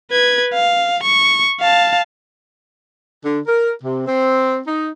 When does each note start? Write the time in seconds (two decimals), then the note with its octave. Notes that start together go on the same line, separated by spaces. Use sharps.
0.11 B4 G#6
0.54 F5
1.03 C#6
1.60 F5 A5
3.25 D3
3.46 A#4
3.84 C3
4.07 C4
4.67 D#4